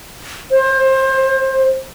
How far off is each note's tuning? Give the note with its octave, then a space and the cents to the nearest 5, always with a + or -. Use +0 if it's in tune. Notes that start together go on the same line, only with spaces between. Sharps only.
C5 +25